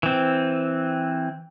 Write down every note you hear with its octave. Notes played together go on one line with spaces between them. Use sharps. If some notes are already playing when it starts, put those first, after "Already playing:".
E3 C4